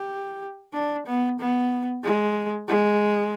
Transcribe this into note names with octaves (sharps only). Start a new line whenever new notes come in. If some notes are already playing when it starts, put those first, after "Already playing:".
Already playing: G4
D4
B3
B3
G#3
G#3